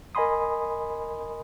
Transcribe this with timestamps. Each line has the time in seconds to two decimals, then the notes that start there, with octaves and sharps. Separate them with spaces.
0.15 A#4 D#5 G#5 B5 C6 D#6